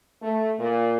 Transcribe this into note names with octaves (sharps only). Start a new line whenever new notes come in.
A3
A#2